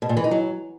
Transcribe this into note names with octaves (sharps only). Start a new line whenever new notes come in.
B2
A#2
E3
D#4
F#3